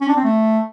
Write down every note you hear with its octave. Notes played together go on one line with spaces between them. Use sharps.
C#4
D4
C4
A3